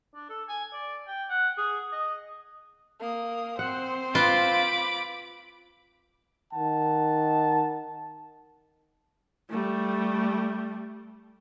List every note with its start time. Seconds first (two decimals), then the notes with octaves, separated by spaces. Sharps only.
0.15 D4
0.30 A4
0.49 G#5
0.73 D5
1.08 G5
1.30 F#5
1.58 G#4
1.92 D#5
3.00 A#3 D#6
3.59 C4 C5 F#5
4.15 F4 B4 B5 D6
6.53 D#3 F#5 A5
9.50 G3 A3